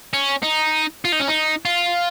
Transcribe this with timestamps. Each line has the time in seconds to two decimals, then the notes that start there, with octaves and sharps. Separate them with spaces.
0.13 C#4
0.43 D#4
1.05 F4
1.12 D#4
1.20 C#4
1.28 D#4
1.65 F4